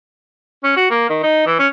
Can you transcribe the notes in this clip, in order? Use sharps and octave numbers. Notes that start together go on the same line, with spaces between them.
C#4
F#4
A#3
D#3
D#4
E3
C#4